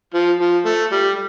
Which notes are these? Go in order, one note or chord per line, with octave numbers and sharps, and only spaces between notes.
F3
F3
A3
G3